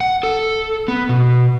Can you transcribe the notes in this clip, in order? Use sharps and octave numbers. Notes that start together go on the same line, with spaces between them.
F#5
A4
B3
B2